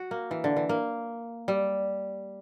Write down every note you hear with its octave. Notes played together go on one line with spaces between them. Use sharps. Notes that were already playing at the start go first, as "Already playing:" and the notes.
Already playing: F#4
A#3
E3
D3
E3
A#3
G3